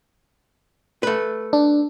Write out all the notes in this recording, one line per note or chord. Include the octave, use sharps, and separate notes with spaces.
A3 B4
D4